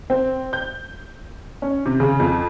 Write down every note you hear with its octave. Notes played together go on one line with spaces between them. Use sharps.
C4
G6
C#4
C3
C#3
F2